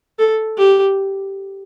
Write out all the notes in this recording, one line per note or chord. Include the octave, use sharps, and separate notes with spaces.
A4
G4